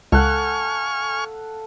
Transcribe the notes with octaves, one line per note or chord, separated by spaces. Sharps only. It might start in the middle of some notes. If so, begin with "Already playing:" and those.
C#2 A4 F5 F#5 G#5 C#6 F6